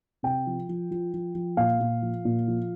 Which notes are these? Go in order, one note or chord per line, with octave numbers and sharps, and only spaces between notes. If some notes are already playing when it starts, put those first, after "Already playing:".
C3 G5
F3
F3
F3
F3
F3
A#2 F5
A#2
F3
A#2
F3